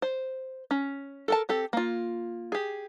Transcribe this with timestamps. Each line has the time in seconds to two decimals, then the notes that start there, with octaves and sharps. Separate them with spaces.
0.02 C5
0.71 C#4
1.28 A4 A#4 A5
1.49 C4 G4 A4
1.73 A#3 F4
2.52 G4 G#4